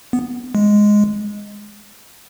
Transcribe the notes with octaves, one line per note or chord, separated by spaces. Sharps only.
B3
G#3